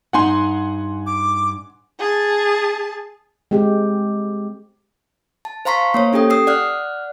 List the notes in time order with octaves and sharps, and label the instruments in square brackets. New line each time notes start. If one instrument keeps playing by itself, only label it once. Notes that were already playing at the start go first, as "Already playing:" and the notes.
[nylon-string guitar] G2 D#4 [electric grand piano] F#5 G#5 C6
[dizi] D6
[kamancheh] G#4 A5
[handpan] G#3 C4 G4
[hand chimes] A5
C5 F5 A#5 C6 C#6 B6
A#3 C5 C#5
C#4 G4 A4 G5 D#6
D#6 E6 C7
D5 F#5 F6 F#6